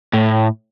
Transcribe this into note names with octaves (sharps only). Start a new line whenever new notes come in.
A2